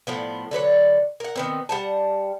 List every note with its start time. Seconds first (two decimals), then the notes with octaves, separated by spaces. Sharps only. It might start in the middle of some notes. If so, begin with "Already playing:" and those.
0.07 A2 F3 B3
0.51 D3 F#3 B4 C#5
1.20 A#4 F#5
1.36 D#3 B3 C4
1.69 G3 F#5 A5